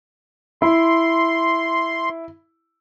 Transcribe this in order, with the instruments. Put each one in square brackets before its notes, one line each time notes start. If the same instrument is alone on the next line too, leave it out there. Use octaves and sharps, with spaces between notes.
[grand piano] E4 [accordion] C6